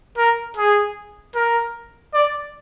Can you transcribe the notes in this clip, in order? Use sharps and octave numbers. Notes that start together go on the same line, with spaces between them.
A#4
G#4
A#4
D5